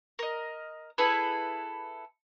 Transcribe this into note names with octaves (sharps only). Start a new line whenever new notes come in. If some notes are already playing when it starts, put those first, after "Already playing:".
A#4 D#5
E4 G#4 A4 B4